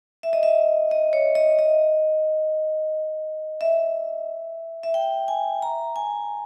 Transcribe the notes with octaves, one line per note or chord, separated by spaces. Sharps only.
E5
D#5
E5
D#5
C#5
D#5
D#5
E5
E5
G5
G#5
A#5
G#5